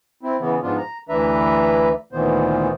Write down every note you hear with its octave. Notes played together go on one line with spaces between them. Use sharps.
C4 E4
C#3 E3 B3
G#2 F3 B3 D4 F4
A#5
D2 E3 D4 B4 E5 A#5
D2 A#2 D#3 E3 B3 C5